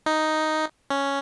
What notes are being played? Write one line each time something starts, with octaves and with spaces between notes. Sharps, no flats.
D#4
C#4